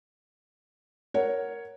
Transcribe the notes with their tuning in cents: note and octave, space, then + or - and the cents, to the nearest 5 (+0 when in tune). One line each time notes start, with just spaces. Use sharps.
A#4 +0 C#5 +0 F#5 +0